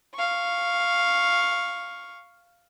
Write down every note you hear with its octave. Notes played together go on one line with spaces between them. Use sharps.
F5 C#6